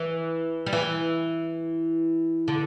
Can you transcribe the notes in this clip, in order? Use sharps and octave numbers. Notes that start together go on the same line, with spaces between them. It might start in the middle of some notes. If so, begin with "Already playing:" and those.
Already playing: E3
G3
E3
D3